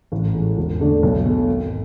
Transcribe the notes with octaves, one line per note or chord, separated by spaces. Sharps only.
A1
A2 E3 G#3
E1
D2 D3 A3 D4
B1
B2 A3
G#1